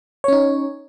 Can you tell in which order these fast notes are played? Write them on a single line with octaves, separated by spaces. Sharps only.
C#5 C#4 D#4